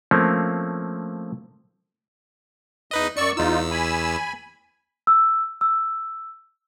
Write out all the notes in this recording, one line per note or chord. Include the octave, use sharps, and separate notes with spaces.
F3 A3 A#3 C4 C#4
E2 D#4 B4 D#5
F#2 D5 C#6 E6 C#7
E2 D#4 F4 E6
G#5 B5
E6
E6